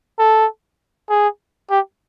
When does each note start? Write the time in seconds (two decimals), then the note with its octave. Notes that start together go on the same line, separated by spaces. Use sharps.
0.19 A4
1.10 G#4
1.70 G4